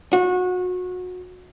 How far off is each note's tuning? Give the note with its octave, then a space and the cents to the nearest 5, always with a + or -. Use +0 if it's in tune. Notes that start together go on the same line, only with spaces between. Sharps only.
F#4 -25